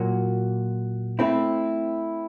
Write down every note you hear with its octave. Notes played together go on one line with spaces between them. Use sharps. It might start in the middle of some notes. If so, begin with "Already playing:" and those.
Already playing: A#2 F#3 A#3
A3 C4 E4